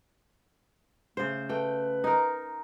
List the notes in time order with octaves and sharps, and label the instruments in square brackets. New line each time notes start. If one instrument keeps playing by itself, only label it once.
[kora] C#3 C5 [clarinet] A3
[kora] A3 G5 [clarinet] B4
[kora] D#4 A#4